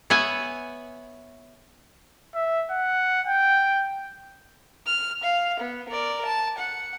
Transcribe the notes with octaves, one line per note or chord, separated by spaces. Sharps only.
B3 C#5 E5 F#5 G#5
E5
F#5
G5
F6
F5
B3
A#4 D5
A5
F#5